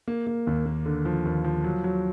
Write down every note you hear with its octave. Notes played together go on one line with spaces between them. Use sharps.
A#3
A#3
D#2
A#3
D3
F3
D#2
F3
F#3
F#3